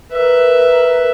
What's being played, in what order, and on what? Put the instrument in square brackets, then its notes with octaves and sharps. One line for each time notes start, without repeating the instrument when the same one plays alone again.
[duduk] A#4 [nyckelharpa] B4 E5